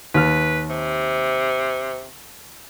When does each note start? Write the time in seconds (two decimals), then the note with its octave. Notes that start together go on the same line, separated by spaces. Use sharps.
0.14 D#2 B4 F6
0.70 C3